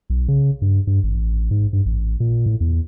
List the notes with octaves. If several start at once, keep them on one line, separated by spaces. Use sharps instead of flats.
B1
C#3
G2
G2
G#1
A1
G#2
G2
A1
A#2
A2
E2